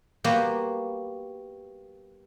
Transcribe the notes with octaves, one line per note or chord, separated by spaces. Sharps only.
G3 A#3 B3 F#4 C5